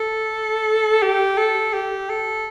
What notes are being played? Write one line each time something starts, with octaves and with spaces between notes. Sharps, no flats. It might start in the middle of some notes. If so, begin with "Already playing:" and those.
Already playing: A4
G4
A4
G4
A4